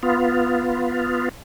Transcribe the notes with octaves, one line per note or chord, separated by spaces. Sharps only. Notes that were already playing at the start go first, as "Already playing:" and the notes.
B3 F4